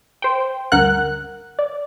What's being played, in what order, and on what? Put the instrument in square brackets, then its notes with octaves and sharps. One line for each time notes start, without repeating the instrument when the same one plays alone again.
[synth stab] C5 G5
D2 G2 A#4 F#5 F#6
D5